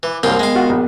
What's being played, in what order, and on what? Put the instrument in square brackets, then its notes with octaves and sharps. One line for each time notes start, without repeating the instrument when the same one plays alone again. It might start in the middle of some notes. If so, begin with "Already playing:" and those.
[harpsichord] E3 [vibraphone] D6
[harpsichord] C2 F#2 F4 [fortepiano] A#3 [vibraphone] A#4
[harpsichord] G#3 F5 [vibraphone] B3 A#4 G5
[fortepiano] F4 F#4 F#5
A#1